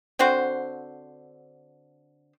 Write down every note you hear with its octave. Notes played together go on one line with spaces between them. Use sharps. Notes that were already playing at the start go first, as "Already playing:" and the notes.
D3 C4 F#4 C5